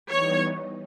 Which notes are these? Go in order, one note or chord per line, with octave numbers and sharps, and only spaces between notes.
E3 G3 B3 D#4 C#5